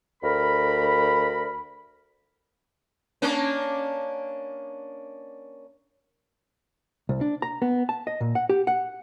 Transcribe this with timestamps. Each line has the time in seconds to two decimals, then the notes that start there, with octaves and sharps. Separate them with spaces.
0.23 D2 A#4 B5
3.22 A#3 C#4 D4
7.09 C2
7.21 D4
7.42 A#5
7.62 B3
7.89 A5
8.07 D#5
8.21 A#2
8.35 F#5
8.49 G4
8.67 F#5